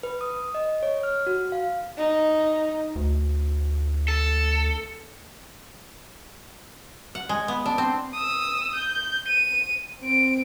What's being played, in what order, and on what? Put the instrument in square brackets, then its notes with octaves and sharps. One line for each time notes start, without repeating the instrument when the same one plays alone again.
[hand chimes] B4
D#6
D#5
C#5
F6
F#4
F5
[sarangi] D#4
[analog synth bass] D2
[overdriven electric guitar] A4
[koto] F#5
G#3
B3
D4
C4
[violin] D#6 E6
G6
D#7
C4 D7